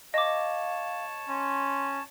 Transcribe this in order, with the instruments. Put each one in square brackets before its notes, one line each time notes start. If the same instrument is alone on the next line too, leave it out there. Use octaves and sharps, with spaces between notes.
[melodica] C#5 A5 [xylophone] D#5 D6 [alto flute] F5
[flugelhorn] C#4 [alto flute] C6